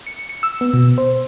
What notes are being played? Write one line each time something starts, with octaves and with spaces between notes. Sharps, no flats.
C#7
C#7
E6
B3
B2
C5